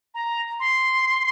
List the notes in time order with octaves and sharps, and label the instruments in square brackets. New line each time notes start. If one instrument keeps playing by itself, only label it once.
[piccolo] A#5
C6